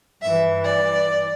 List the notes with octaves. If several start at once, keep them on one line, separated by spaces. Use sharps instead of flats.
G2 E3 E5
D5